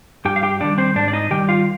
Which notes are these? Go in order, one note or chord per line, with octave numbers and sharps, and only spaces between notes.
G2 G4 G5
F5
G4 G5
D#3 G3 D4 D5
C4 C5
G#2 D4 D5
D5
D#4 D#5
D#3 G3 G4 G5
F4 F5